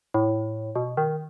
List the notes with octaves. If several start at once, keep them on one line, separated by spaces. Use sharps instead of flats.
A2
B2
D#3